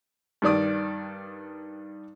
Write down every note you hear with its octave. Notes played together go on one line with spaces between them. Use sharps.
G2 D#3 D5 D#6